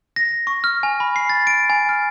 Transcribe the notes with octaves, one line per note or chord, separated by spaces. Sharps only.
A#6
C#6
F6
G#5
B5
C7
A6
D7
G#5
F6